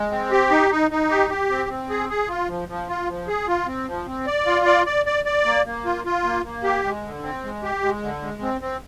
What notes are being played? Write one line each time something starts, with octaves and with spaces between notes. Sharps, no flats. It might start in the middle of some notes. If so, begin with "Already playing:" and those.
Already playing: G#3
C4
G4
D#4
D#4
D#4
G4
G4
C4
C4
G#4
G#4
F4
F3
F3
F4
F3
G#4
F4
C4
F3
C4
D5
F4
D5
D5
D5
D5
A#3
A#3
F4
F4
A#3
A#3
G4
G#3
D3
C4
G#3
G4
G#3
D3
G#3
C4
C4